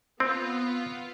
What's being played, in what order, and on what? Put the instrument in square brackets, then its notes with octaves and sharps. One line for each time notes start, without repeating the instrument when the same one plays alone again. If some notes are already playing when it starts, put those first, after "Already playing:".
[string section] B3 F4 [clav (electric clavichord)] C4